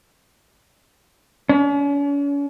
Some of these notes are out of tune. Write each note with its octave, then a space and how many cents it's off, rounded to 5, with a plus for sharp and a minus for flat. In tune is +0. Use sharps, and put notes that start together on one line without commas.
C#4 +40